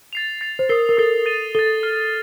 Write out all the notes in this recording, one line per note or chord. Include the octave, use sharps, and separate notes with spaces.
A6 C7 F7
A6 C7 F7
C5
A#4 D#6 A6 C7 G7
A#4
A4 D#6 A6 C7 G7
A6 D#7 G7
A4 A6 D#7 G7
F6 C7 G7